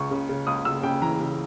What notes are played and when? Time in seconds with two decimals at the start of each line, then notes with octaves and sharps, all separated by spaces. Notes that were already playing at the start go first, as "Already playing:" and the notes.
Already playing: C#2 C#6
0.11 C#3
0.29 C#3
0.47 C#2 D#6
0.65 C#2 E6
0.83 C#3 G5
1.02 E3 A#5
1.20 C#3